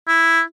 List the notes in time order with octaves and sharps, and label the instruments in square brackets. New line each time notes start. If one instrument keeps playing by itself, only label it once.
[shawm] E4